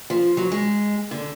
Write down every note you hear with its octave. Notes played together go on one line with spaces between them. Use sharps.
F3
F#3
G#3
D3